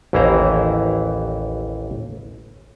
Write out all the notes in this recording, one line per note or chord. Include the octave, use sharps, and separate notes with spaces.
A1 D#2 E3 E4 C5 A#5